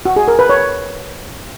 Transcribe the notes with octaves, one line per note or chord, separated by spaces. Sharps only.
F#4
G#4
A#4
B4
C#5